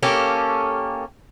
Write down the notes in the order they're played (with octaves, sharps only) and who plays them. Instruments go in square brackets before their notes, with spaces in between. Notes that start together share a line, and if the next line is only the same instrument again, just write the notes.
[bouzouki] A#3 C#4 G4 A4